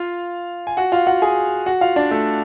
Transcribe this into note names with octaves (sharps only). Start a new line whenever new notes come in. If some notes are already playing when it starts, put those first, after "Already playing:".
Already playing: F4 F5
G#5
F#4 F#5
F4 F5
F#4 F#5
G#4 G#5
F#4 F#5
F4 F5
D4 D5
A3 A4